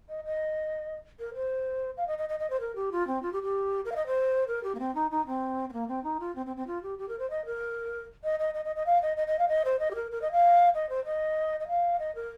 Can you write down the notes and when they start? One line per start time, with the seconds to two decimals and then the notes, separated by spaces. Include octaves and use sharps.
0.09 D#5
0.25 D#5
1.19 A#4
1.34 C5
1.97 F5
2.07 D#5
2.18 D#5
2.29 D#5
2.39 D#5
2.50 C5
2.60 A#4
2.76 G4
2.92 F4
3.07 C4
3.22 F4
3.33 G4
3.43 G4
3.85 A#4
3.92 F5
3.96 D#5
4.07 C5
4.48 A#4
4.64 G4
4.75 A#3
4.80 C4
4.95 D#4
5.11 D#4
5.27 C4
5.69 C4
5.73 A#3
5.88 C4
6.04 D#4
6.20 F4
6.36 C4
6.46 C4
6.57 C4
6.67 F4
6.83 G4
6.99 G4
7.09 A#4
7.19 C5
7.30 D#5
7.46 A#4
8.24 D#5
8.40 D#5
8.54 D#5
8.65 D#5
8.76 D#5
8.86 F5
9.02 D#5
9.17 D#5
9.27 D#5
9.39 F5
9.48 D#5
9.65 C5
9.80 D#5
9.91 G4
9.95 A#4
10.12 A#4
10.22 D#5
10.32 F5
10.75 D#5
10.89 C5
11.05 D#5
11.60 D#5
11.68 F5
11.99 D#5
12.15 A#4